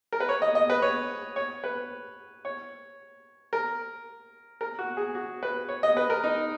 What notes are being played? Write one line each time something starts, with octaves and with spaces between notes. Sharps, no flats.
A#4
B4
C#5
D#5
D#5
B4
C#5
C#5
B4
C#5
A#4
A#4
F#4
G#4
F#4
B4
C#5
D#5
B4
A#4
D#4